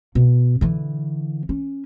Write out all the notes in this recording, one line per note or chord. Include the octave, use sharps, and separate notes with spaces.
B2
D3 E3
C#4